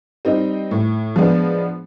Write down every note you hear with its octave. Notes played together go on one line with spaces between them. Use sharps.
G3 C4 D#4
A2
F3 G#3 B3 D4